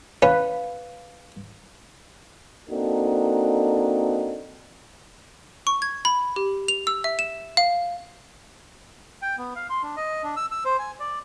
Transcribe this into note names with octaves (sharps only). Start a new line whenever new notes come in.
C#4 B4 F5
A#3 C4 D4 D#4 F#4 A4
C#6
G#6
B5
G4
F7
E6
E5
E7
F5
G5
B3
F5
C6
D4
D#5
D4
E6
E6
C5
G#5
D5